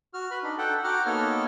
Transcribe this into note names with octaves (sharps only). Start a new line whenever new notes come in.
F#4 F6
B4 B5
D4 D#4
A4 F#5 G5
F#4 F#5 G5 A#5 D6 F6
A#3 B3 D#4 A4 C#5 F6